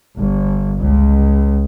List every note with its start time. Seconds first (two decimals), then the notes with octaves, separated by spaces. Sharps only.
0.17 G1
0.79 C#2